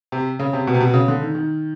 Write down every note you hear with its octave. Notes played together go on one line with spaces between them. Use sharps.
C3
C#3
C3
B2
C3
B2
C#3
D3
D#3
D#3